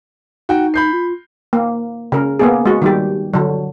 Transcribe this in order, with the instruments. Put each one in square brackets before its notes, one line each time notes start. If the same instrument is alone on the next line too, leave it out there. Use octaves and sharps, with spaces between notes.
[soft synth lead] D#4 [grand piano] F#4 G5
[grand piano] B5 G6 C7
[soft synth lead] F4
[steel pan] A#3
C#3 A#4
A#3 B3 G#4
G#3 F#4
D#3 G3 G4
D3 F#3